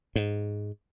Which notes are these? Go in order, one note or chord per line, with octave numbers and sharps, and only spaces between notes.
G#2